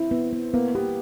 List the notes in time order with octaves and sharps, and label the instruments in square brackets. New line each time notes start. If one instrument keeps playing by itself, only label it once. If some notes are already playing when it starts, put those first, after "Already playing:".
Already playing: [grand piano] C4 [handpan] E4
[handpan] B3
B3
[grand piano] A#3 [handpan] B3
[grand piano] B3 [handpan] G4